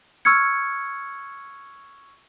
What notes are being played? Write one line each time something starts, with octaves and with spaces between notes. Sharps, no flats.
C#6 E6 F6 G#6 C#7